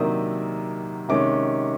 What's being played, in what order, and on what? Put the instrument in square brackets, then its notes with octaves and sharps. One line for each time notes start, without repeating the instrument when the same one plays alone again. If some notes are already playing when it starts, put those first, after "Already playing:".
Already playing: [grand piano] C3 D#3 F#3 A#3 D4 D#6 E6
C3 D#3 G#3 C#4 D6